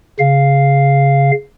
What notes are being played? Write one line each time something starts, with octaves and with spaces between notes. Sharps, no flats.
C#3 F5